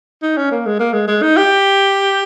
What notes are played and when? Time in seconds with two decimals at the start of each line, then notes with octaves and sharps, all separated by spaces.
0.22 D#4
0.37 C#4
0.51 A#3
0.66 G#3
0.79 A#3
0.93 G#3
1.07 G#3
1.22 D#4
1.37 G4